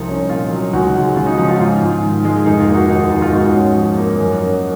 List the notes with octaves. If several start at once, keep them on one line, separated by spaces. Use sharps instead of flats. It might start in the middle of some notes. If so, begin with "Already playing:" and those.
Already playing: C2 C3 F3 D#4
C#4
A#2 F4
F#3
C#2 D#4 F#4
G#3
C#3 F4
D#4 F#4
F3 D#4
F4
G#2 F4
G#2
D#3
G#3
F1 D#4
F4
A#3
D#4 F#4
D#2 D#4
F4
D#3 F4
F4
G#2 D#4 F#4
C#4
F3
A#3
F#2
C#4